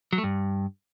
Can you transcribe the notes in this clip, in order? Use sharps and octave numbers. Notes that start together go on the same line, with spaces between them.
F#3
A3
G2